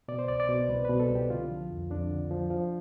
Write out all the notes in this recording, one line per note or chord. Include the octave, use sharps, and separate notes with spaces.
B2 D5
C5
C2 D5
D5
B2
C2 B4
B2 B4
A4
C2
G4
D3 F4
F3
F2
F2 D4
D3
F3
F3